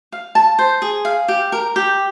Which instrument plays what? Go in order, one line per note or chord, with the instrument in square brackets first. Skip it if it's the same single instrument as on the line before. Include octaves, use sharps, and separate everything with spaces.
[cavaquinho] F5
A5
C5
G#4
F5
G4
A#4
G4